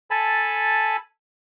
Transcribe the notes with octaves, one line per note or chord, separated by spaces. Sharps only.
A4 G#5 A5 B5